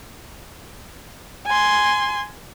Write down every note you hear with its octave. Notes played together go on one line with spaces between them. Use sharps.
G#5 C6